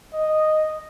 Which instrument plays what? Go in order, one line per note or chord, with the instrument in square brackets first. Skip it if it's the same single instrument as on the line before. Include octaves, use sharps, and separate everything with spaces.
[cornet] D#5